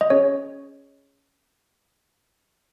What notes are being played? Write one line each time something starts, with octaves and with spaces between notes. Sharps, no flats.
D#5
C#4 G#4 C#5